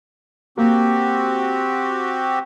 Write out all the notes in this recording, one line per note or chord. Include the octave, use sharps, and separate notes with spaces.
A#3 C4 F#4 G4